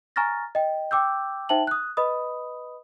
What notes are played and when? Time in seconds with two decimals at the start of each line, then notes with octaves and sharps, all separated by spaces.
0.16 G#5 A#5 C#6 F6 A6 A#6
0.55 D#5 G5
0.91 G5 D6 E6 G6
1.49 D#4 C5 E5 G5 A5 F#7
1.67 D#6 F#6
1.97 B4 D#5 B5 D#6